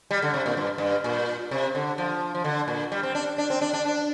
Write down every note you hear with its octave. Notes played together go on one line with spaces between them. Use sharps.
G3
D3
C3
A#2
G2
G2
A#2
C3
D3
F3
F3
D3
A#2
G3
C4
D4
D4
C4
D4
D4
D4